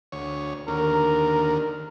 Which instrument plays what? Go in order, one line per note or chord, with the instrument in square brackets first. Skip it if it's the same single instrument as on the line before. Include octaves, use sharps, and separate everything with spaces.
[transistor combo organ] D2 C#5
[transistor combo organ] D#2 D3 [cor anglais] A#4